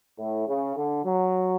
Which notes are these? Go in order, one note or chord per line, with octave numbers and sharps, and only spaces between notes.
A2
C#3
D3
F#3